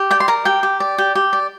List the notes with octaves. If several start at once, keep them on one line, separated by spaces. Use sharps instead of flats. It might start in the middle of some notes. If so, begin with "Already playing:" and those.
Already playing: G4
D5 G5
C6
A#4 A#5
G4 G5
G4
D5
G4
G4
D5